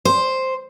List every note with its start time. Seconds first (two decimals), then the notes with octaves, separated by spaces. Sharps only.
0.05 C5